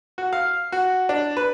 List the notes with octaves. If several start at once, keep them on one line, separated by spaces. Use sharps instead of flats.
F#4
F5
F#4
D4
B4